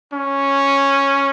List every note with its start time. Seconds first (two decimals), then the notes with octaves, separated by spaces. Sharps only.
0.13 C#4